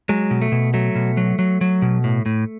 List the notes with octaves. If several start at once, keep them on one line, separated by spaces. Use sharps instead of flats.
F#3 G#3
B2
A3
B2
F#3 A3
B2
F#3
F#3
F#3
B2
A2
A2